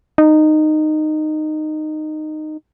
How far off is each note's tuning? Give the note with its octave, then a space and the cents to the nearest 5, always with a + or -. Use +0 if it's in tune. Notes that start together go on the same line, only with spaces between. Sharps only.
D#4 -15